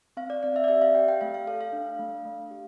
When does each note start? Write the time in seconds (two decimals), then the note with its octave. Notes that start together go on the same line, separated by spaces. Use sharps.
0.17 C4 F5
0.30 D5
0.43 C4 D5
0.56 E5
0.64 D5
0.68 G4 E5
0.82 F5
0.95 G4 G5
1.08 G5
1.21 A3 F5
1.34 F5
1.47 A4 F5
1.61 F5
1.73 D4
1.99 A3
2.25 A3
2.51 G4